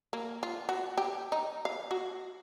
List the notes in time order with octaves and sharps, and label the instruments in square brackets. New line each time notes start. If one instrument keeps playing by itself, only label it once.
[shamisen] A#3
F4
F#4
G4
D#4
F5
F#4